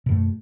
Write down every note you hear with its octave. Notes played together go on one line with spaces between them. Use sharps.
F#2 B2 A3